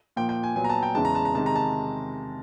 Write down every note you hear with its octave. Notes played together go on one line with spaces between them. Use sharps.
A#2 F3 A#3 G5
G5
G#5
A#2 F#3 B3 G#5
A#5
A5
G5
E2 C#3 E3 G#3 A5
A#5
A5
A#5
C3 D#3 G#3 A5
A#5
A5